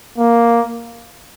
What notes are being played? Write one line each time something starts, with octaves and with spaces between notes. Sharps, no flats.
A#3